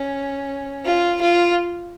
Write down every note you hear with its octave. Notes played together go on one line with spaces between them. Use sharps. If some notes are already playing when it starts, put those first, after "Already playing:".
Already playing: C#4
F4
F4